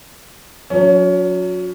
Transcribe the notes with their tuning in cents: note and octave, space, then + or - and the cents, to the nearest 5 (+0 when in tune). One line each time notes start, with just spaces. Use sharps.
F#3 -30 C#4 +25